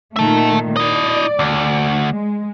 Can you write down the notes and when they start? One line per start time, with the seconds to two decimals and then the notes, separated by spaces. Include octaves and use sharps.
0.16 A#2 D#3 A3 E5 A5
0.77 E4 D5 D#5
1.39 D2
2.12 G#3